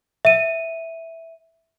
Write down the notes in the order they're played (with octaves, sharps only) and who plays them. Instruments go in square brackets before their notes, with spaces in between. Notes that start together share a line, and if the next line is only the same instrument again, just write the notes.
[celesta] E5 D#7